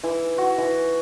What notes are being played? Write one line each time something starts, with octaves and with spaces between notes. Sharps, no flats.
E3
F#4
E3